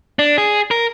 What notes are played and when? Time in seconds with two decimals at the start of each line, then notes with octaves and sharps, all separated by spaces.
0.19 D4
0.38 G#4
0.71 A#4